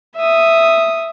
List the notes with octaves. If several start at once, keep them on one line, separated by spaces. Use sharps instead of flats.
E5 D#6